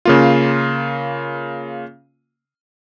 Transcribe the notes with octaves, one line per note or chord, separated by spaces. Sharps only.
C#3 A#3 F4